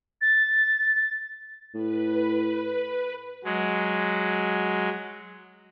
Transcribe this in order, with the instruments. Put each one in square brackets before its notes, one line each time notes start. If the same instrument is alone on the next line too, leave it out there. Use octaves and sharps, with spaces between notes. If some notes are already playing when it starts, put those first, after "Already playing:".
[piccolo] A6
[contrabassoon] A2 [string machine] B4
[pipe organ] F#3 G#3